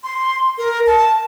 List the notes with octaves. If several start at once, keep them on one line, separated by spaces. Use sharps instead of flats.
C6
A#4
A5